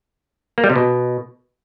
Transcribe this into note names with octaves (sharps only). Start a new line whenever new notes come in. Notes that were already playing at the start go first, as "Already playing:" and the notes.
A#3
G3
C3
B2